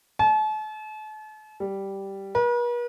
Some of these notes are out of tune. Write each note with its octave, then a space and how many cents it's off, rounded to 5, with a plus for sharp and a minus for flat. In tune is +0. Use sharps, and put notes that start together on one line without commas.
A5 -40
G3 -5
B4 -45